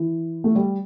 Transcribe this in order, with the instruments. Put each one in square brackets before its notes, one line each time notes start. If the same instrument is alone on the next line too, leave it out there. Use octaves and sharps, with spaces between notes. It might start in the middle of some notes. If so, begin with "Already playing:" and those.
Already playing: [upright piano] E3
A3
G3